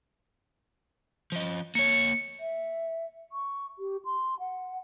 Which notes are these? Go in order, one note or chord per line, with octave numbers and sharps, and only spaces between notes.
F3 D#5
A#3 C#5 C#7
E5
C#6
G4
C6
F#5